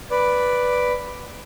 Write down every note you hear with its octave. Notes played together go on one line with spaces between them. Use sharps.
B4 D5